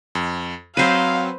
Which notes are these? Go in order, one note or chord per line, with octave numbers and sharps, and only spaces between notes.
F2
F#3 C4 B4 C5 F5 D#7